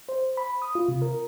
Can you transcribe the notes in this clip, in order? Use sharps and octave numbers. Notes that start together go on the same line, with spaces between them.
C5
B5
D#6
F4
C3
A#4